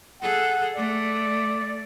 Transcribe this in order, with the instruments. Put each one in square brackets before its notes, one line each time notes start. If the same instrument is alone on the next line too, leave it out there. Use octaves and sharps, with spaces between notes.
[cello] G#4 A4 [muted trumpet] F#5
[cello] A3 [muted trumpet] D5